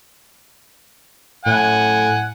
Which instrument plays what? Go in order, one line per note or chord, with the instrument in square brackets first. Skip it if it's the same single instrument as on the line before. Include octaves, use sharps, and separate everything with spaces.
[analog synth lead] A2 [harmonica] F#5 G#5